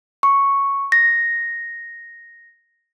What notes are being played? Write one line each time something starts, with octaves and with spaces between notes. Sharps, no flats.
C#6
A#6